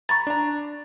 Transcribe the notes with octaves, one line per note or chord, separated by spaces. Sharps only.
A#5 B5 C#6 A6
D4 A#5